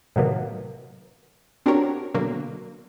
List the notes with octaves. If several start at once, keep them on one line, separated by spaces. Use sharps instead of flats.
A2 C3 D#3 F#3 A#3 B3
C4 D4 F#4 G4 A#4 C#5
B2 D3 F#3 A#3